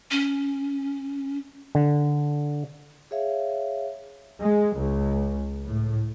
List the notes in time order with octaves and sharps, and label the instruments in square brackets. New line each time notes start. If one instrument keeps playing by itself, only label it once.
[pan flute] C#4
[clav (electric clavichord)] D3
[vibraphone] G#4 C#5 E5 F5
[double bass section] G#3
C#2
A2